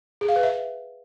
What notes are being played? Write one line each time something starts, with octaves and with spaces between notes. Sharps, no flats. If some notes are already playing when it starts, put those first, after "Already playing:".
G#4
F5
B4
E5